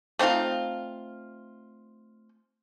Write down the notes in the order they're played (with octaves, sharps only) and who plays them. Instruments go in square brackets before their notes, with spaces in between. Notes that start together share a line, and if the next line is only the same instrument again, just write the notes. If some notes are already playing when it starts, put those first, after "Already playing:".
[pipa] A3 C4 D#4 F4